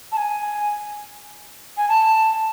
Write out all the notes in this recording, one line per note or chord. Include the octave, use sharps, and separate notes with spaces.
A5
G#5
G#5
A5